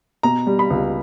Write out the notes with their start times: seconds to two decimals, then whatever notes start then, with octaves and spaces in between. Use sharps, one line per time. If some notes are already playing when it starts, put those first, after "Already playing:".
0.23 B2 A#5
0.47 G3
0.59 B5
0.70 C#2